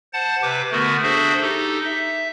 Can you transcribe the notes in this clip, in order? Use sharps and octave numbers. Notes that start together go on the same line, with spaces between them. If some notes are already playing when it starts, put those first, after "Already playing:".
C5 F#5 A5 A6
C3 B4 D6
D3 A3 B3 F#4 A#4
D4 F#4 G#4 A4 C5 E5
D#4 G4 A4
E5